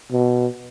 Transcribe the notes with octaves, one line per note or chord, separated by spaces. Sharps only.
B2